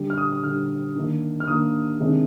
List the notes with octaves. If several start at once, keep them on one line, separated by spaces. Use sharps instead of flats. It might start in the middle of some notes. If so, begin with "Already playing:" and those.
Already playing: D3 G3 D4
F6
D#6
D#6
D3 G3 D4 F6
D#3 A#3 D4
F6
D#3 A#3 D4 D#6
C3 D#3 G#3 D4